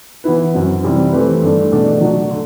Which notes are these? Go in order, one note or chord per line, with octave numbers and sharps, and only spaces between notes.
E3 B3 E4 B4
F#2 F#3 C4 F#4
C3 E3 G3 C4 E4
E3 A3 C4 G4 B4
G2 D3 A3 D4
E2 B2 A3 D4
F#3 A3 D4 F#4
D3